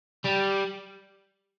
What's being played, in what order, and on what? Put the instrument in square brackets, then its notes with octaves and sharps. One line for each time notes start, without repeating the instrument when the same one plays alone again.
[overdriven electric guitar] G3